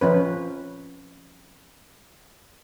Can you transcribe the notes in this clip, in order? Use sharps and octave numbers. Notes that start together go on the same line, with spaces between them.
F3 C#4 B4